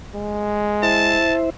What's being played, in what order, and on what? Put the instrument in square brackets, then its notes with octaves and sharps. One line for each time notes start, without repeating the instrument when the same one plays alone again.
[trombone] G#3
[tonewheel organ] E4 C5 E5 [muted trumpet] A5